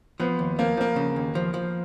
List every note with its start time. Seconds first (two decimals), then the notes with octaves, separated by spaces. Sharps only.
0.20 F3 B3
0.39 D#2
0.59 F3 A#3
0.77 F3 A#3
0.96 C#3
1.16 D#2
1.35 F3
1.54 F3